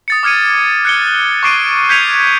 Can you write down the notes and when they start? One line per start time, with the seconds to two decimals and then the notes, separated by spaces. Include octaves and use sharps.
0.08 D#6 A6 C#7
0.23 D6 F6 G#6 C#7 D#7
0.85 F#6 C#7 G7
1.43 C#6 D6 C7 D7 D#7
1.89 G6 G#6 B6 C#7 D#7 F7